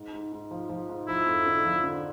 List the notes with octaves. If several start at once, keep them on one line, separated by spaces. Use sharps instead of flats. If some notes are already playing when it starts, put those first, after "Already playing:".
Already playing: G#2
G#2
G#2
F3
F3
G#2
F3 E4
F2
D3
F3
D3